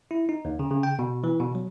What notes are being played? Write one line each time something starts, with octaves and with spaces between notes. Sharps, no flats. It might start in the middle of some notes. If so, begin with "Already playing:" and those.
E4
D#4
D#2
C#3
C#3
G5
B2
E3
B2
F#3